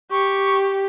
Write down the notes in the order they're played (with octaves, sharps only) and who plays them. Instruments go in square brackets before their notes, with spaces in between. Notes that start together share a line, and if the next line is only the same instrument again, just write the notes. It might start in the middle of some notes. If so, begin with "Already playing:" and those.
[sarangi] G4 [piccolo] C#6